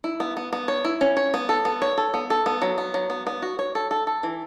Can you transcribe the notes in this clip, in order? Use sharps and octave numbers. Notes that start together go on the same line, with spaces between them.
E4
B3
B3
B3
C#5
E4
C#4
C#5
B3
A4
B3
C#5
A4
B3
A4
B3
F#3
B3
F#3
B3
B3
F#4
C#5
A4
A4
A4
E3